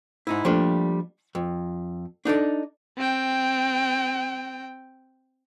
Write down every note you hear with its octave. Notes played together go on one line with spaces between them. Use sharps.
G#2 D#4 E4
F3 G3 A3 A#3 D4
F2
D4 D#4 A4 D5
C4 G5